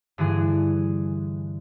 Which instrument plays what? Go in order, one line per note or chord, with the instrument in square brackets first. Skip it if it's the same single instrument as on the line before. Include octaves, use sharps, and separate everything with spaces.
[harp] G2 D3 E3 G#4